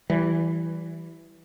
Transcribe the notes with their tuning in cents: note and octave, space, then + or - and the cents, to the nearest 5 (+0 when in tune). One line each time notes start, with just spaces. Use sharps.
E3 +0 G3 -30